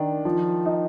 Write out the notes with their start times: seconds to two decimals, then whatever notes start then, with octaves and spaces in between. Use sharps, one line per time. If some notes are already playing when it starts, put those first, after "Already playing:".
Already playing: D#3 D4
0.25 F3
0.65 D#4